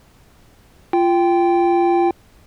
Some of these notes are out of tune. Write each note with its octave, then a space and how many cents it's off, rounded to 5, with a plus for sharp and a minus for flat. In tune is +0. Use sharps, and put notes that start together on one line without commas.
F4 -15 G5 +0